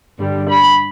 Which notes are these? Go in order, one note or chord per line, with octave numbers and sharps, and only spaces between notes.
G2 D3 G3
B5